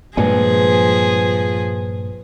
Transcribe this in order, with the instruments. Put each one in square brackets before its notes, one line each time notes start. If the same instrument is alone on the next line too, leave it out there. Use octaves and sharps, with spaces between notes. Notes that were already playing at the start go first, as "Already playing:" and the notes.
[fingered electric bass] G2 A#2 G#3 [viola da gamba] F3 G#4 [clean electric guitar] B4 C#5 G#5